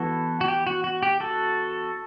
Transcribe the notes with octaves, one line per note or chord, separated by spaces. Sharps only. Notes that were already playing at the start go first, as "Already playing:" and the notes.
Already playing: E3 B3 E4 F#4 A4
F#4
G4
F#4
F#4
G4
F#4 A4